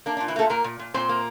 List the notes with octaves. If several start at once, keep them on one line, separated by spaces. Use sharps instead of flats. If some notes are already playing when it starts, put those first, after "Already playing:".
A#3 D4
D4
A#2
E3 E4
A3 A#3 A4
A#2 A#3 A#4
A#2
A#2
A#2 C4 C5
A#3